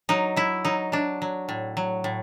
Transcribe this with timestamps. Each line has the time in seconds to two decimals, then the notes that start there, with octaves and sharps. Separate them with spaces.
0.09 F#3 D#4
0.36 F#3 E4
0.65 F#3 D#4
0.92 F#3 D4
1.22 F#3
1.49 A2
1.77 F#3
2.04 A2